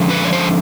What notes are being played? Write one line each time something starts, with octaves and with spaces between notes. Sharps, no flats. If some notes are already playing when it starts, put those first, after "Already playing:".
Already playing: D3 F3 G#3 C#4
B4
C#5
C5